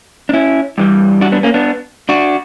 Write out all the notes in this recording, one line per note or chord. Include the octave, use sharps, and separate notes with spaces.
D4
C#4 E4
G2 E3 G3
D4 F#4
B3 D4
A#3 C#4
B3 D4
D4 F#4